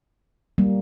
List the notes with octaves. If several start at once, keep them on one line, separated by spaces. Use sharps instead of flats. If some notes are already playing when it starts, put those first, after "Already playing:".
G3 A#3